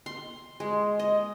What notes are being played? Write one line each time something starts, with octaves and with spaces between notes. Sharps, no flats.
C6
G#3
D#5